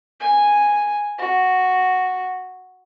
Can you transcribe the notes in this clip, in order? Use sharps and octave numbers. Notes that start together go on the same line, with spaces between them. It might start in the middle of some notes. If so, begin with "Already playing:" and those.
G#5
F#4